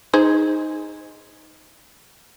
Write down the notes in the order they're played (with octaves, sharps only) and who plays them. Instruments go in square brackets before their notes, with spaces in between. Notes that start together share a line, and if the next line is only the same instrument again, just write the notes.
[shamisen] D#4 G#4 C5